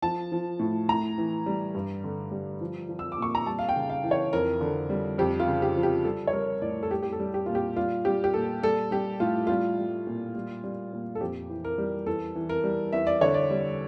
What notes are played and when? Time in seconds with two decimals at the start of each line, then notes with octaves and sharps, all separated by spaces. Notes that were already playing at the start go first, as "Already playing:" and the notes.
0.02 F3 A5
0.32 F3
0.59 A2
0.89 A2 A#5
1.18 E3
1.46 G3
1.75 G2
2.04 D3
2.31 G3
2.61 F3
2.89 F3
2.99 E6
3.12 D6
3.18 A#2 C#6
3.35 A#5
3.46 G3 A5
3.59 F5
3.69 G5
3.76 C#3
3.90 F5
4.04 E3
4.11 C#5
4.33 F2 A#4
4.61 D3
4.90 G3
5.18 F2 G4
5.40 F4
5.48 C#3
5.62 G4
5.77 F3
5.83 G4
6.04 G3 A4
6.27 C#5
6.33 G3 A#4
6.62 A2 D5
6.83 A4
6.91 G3 G4
7.03 G4
7.13 A4
7.20 G3
7.34 G4
7.46 A#2 F4
7.55 G4
7.76 G3 F4
8.05 G3 G4
8.24 G4
8.34 A#2 A4
8.63 G3 A4
8.91 G3 G4
9.20 A2 F4
9.47 G3 F4
9.78 G3
10.07 A#2
10.35 G3
10.64 G3
10.93 A#2
11.15 A4
11.21 F2 G4
11.49 E3
11.65 A#4
11.78 G3
12.06 E2 A4
12.35 E3
12.49 A#4
12.64 G3
12.92 E2 E5
13.07 D5
13.21 D3 C#5
13.34 D5
13.50 G3